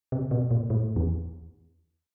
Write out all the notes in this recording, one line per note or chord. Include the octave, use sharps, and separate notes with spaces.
C3
B2
A#2
A2
E2